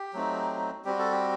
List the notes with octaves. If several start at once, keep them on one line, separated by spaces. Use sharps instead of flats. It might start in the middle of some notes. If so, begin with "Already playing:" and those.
Already playing: G4
F#3 A3 C4 D#4
G3 C4 F#4 G4
A4
G4